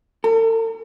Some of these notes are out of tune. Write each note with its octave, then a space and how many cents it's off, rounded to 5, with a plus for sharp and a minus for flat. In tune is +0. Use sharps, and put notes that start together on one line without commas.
A4 +45